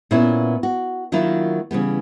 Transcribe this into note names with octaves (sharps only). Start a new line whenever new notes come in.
A#2 B3 C#4 E4 C#5
F#4
D#3 F#3 A#3 D4 E4 F4
C#3 E3 G3 B3